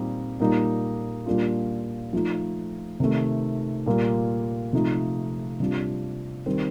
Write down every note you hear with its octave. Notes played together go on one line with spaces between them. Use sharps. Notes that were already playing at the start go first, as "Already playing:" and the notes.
Already playing: A#2 G3 C4 D#4
A#2 G3 A#3 D#4
A#2 G3 A#3 D4 F4
F3 A3 D#4
C3 D#3 A3
A#2 G3 A#3 F4
C3 F3 A3 D#4
C3 G3 D4 F4
D#3 G3 C4